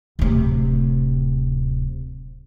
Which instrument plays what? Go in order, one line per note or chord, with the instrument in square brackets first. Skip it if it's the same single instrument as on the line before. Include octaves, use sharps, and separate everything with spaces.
[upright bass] D1 C3